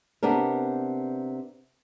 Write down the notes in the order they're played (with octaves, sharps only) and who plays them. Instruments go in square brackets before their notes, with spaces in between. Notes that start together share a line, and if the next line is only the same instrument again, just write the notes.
[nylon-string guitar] C3 B3 D4 A#4